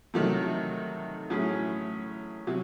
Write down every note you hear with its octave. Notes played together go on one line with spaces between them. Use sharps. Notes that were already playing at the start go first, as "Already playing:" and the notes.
C3 D#3 F#3 A3
A2 F#3 C#4 G#4
C3 F#3